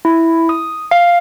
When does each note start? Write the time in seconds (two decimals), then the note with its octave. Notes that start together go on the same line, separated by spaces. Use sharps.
0.05 E4
0.49 D#6
0.91 F5